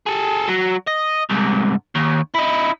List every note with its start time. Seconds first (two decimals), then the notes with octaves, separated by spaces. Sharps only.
0.06 G#4 A4
0.49 F#3
0.88 D#5
1.30 C2 G#2
1.95 D#2
2.35 D#4 E4